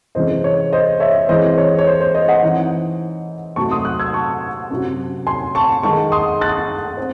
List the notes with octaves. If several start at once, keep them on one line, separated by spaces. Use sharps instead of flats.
C3 E3 G#3 C#4 C5 D#5
C#5
C5 D#5
C#5 E5
E3 G#3 C4 C5 D#5
C#5
C#5
C5
C5
C5 D#5
D#5 F#5
E3 C4 D#4
C3 F#3 A3 D#4 A5 C#6
C6 D#6
D#6 F#6
E6 G#6
A5 C#6
C3 F#3 C#4
G#5 C6
A5 C#6
D#3 G#3 D#4 A5 C#6
C6 D#6
F#6 A6
C4